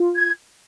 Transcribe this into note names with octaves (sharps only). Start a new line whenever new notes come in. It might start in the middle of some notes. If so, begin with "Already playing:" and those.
Already playing: F4
G#6